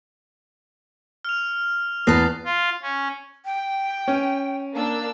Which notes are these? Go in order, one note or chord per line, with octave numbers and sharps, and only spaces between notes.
F6 F7
E2 B4 A5 D#6 A#6 C7
F4
C#4
G5
C#4
A#3 D4 E6